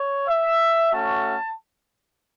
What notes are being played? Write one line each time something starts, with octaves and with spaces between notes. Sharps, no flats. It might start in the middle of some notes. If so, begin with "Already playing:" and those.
Already playing: C#5
E5
A3 C#4 F#4 A5